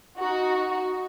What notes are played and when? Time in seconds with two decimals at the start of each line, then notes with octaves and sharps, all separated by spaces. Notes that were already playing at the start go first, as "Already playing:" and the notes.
0.18 D#4 F#4